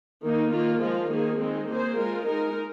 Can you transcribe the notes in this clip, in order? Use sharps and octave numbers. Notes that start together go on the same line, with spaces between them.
D#3 A#3 D#4
D#3 A#3 F4
F3 G#3 F4
D#3 A#3 G#4
D#3 G#3 C4
A#3 G#4 C5
G#3 F4 A#4
G#3 D#4 A#4